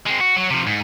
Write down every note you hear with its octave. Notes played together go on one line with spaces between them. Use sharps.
G#3 C4
F#4
F#3
C3 F3
G#2